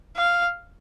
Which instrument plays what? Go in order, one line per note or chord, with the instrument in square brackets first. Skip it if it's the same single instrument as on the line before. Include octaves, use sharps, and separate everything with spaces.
[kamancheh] F5